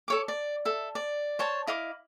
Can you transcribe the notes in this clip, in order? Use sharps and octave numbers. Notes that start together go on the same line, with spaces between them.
A4 C#5 D6
D5
A4 E5
D5
C5 C#5 A5
E4 D#5 F5 D6